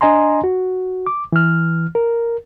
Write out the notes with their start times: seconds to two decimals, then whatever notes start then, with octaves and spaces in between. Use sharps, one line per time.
0.01 D4 D#5 G#5 A#5 C6
0.44 F#4
1.06 D6
1.32 E3 F6
1.95 A#4